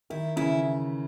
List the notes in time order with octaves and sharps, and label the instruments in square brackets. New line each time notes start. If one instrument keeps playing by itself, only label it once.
[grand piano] D#3 [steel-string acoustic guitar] E4
[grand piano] C#3 E3 [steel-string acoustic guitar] E4